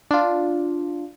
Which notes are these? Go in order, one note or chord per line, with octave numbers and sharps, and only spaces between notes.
D4 F4